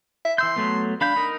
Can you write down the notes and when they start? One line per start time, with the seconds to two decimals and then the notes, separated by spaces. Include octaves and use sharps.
0.25 E5
0.38 E3 C6 E6 G6
0.56 F#3 A3 B3
1.01 D4 F5 B5 G6
1.16 D#4 A#4